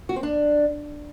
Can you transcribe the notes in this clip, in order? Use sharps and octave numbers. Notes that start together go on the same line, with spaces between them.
F#4
C4
D4